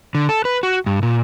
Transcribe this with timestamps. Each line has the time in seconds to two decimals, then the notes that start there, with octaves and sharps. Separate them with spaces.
0.15 D3
0.29 A4
0.45 B4
0.63 F#4
0.86 G2
1.03 A#2